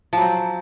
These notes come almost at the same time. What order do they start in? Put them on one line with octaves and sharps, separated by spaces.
F3 F#3 C4